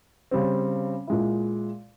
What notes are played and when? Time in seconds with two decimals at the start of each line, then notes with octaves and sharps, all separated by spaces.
0.31 C#3 G3 C4
1.07 A#2 G#3 E4